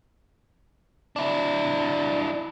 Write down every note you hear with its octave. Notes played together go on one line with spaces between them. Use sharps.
D4 E4